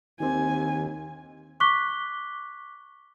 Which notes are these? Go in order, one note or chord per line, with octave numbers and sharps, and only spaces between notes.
D#2 D#3 C4 G4 G#5
C#6 D6 F#6 B6 G7